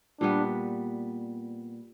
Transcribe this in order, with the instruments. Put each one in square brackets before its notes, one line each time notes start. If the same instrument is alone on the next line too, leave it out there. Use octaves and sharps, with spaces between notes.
[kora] A#2 G3 B3 [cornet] D4